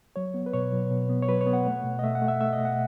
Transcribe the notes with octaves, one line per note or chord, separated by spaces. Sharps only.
F#3 C#5
B3
B4
B2 C#5
F#3
B2
B3
C#5
F#3 B4
C#5
B3
F#5
A3
B2
D#5
A3 E5
F#5
A3
E5
A3 E5
D#5
B2
F#5